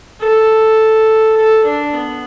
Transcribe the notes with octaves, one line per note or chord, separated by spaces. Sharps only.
A4
A4
D4
B3